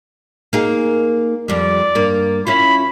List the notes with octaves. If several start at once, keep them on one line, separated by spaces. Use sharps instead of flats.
A#3 D#4 G#4
F2 G3 D5
G2 A#3
C#4 E4 F4 B5